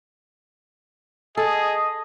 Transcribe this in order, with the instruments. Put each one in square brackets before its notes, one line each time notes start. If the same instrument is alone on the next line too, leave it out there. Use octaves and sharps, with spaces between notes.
[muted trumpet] G#4 [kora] A4 [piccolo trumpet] D#5